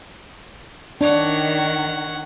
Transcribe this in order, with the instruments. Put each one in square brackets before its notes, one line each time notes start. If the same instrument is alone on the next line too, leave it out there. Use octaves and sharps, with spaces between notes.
[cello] D#3 [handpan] D4 [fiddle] C#5 F#5